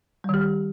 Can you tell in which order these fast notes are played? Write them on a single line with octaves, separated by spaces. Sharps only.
G3 D#3 G4